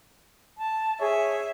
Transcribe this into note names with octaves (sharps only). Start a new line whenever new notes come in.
A5
G#4 C#5 E5